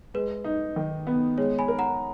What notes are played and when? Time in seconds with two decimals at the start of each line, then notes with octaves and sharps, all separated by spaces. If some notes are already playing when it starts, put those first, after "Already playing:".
0.14 G#3 B4
0.44 D#4
0.76 D#3
1.07 B3
1.38 G#3 C#5
1.59 G#5 B5
1.68 A#4
1.79 F#5 A#5